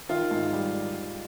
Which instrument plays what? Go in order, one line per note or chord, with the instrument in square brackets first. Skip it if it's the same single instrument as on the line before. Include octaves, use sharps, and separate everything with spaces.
[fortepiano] D#3 [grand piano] F4
[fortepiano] G#2
G3